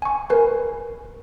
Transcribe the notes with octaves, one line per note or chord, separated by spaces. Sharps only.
G#5 C#6
A#4 B4 G#5